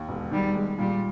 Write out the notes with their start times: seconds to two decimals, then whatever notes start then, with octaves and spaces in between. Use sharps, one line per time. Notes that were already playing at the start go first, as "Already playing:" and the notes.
Already playing: D#2
0.08 E1
0.31 D#3 G3
0.55 G#3
0.79 A#2 G3